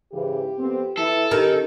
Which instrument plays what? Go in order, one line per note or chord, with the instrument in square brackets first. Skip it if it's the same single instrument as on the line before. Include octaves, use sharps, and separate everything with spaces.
[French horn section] G#2 C#3 E3 [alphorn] G4
[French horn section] F2 B3 C4
[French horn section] E3 E4 [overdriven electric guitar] A4
[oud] D#3 [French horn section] C#4 D#4 G4